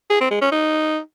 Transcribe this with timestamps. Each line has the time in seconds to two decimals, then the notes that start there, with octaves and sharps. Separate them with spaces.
0.10 G#4
0.21 C4
0.31 G#3
0.41 C#4
0.52 D#4